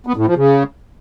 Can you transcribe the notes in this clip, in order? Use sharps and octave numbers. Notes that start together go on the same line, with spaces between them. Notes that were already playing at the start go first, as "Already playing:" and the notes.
B3
A2
F3
C#3